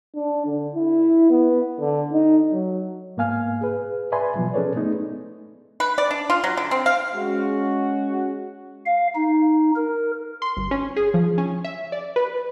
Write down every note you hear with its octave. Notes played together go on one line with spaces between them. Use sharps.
D4
D3
E4
B3
D3
D#4
F#3
G#2 A#3 B3 F5 G#5 F6
G#4 B4
B4 D5 E5 G#5 B5 C6
B2 F3 F#3
C#4 G#4 A4 B4 C#5 D5
A3 B3 D#4
B4
D5
D4
F4
F#3
D3
C4
F5
G#3 C#4 F#4
F5
D#4
A#4
C6
G1
C#4
G#4
F3
C#4
E5
D5
B4